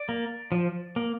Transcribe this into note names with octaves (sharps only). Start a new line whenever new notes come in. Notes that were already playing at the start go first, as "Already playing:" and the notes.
Already playing: D5
A#3
F3
A#3